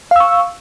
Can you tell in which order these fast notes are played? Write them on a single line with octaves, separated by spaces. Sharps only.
F5 E6 C#6